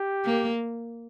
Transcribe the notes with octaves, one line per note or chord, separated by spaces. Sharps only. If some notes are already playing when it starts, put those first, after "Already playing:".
Already playing: G4
A#3